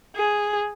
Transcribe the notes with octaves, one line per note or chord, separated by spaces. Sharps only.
G#4